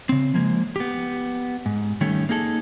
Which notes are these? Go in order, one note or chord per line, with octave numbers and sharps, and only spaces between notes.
C#3 C4
F3 G#3 A#3
B3 G4
G#2
D#3 G3 A3 C#4
A#3 D#4 G#4 A4